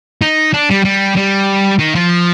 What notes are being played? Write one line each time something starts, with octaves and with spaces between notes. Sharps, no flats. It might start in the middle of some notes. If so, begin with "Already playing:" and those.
D#4
D4
G3
G3
G3
D#3
F3